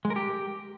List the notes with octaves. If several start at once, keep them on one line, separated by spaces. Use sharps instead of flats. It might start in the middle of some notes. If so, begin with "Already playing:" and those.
G#3
A#4
G4